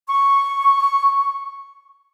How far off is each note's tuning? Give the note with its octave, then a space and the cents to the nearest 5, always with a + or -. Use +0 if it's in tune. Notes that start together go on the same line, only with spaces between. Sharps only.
C#6 -5